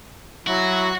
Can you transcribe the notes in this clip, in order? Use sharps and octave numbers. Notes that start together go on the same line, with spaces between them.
F#3 E4 F#4